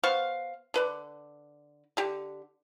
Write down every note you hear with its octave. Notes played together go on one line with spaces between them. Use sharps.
B3 C5 F5 C#6
D3 B4 D5
D3 G4